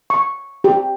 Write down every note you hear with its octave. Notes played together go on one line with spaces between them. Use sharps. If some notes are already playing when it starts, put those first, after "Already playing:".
C#6
G4